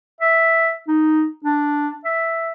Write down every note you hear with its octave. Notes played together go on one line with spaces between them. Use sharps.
E5
D#4
D4
E5